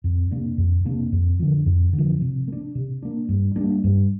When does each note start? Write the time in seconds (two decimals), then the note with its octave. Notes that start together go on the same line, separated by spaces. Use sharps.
0.04 F2
0.31 C3 A#3 D4
0.58 F2
0.85 C3 A#3 D4
1.12 F2
1.39 D3 F3
1.66 F2
1.93 D3
1.98 F3
2.21 C3
2.48 A#3
2.52 D4
2.75 C3
3.02 A#3 D4
3.29 G2
3.56 G3 A#3 D4
3.84 G2